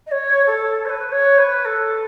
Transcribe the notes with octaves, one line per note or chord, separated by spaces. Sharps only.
D#5
C#5
A4
C#5
B4
C#5
B4
A4